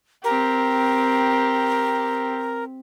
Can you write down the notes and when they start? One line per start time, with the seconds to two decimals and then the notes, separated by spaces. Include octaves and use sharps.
0.24 C4 G4 A#4